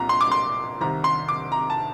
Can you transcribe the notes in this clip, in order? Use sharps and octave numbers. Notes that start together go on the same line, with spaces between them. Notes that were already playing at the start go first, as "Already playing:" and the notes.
Already playing: C2 A#2 A#5
C6
D6
C6
C2 C3 D#3 A#5
C6
D6
A#5
A5